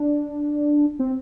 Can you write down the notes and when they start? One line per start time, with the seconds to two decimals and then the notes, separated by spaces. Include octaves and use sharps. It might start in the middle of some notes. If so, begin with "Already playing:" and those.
Already playing: D4
0.99 C4